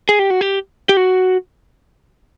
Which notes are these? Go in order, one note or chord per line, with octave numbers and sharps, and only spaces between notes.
G#4
G4
F#4
G4
G4
F#4